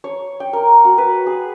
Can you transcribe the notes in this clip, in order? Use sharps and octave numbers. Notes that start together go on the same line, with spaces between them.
C#5
G5
A#4
F#4
B4
G#4